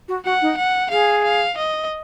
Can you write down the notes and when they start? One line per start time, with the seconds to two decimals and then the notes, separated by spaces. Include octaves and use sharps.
0.08 F#4
0.25 F#4 F#5
0.42 D#4
0.57 F#5
0.91 G#4 F5
1.24 F5
1.57 D#5